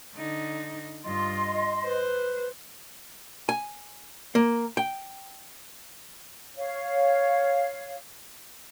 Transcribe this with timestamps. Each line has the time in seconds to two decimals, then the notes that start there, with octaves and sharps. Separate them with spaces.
0.15 D3 D#4
1.05 G2 F4 D#5 C6
1.84 B4 C5
3.49 G#5
4.35 A#3
4.77 G5
6.56 C#5 F5